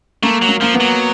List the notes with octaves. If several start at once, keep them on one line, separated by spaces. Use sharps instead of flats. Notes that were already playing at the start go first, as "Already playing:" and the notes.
A3 A#3
F#3
A#3
F3 A#3
B3
F#3